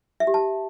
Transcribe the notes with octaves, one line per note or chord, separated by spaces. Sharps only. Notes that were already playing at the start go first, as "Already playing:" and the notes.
E5
G4
A5